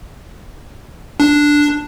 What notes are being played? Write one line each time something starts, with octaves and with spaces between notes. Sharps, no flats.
D4